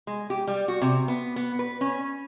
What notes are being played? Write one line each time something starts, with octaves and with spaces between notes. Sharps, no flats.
G#3
G4
G3
F#4
C3
B3
B3
B4
C#4